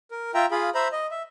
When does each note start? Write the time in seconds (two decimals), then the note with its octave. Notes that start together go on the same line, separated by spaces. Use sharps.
0.11 A#4
0.34 F4 E5 G5 A#5
0.51 F4 G#4 F5 B5
0.75 C5 E5 A#5 B5
0.92 D#5
1.11 E5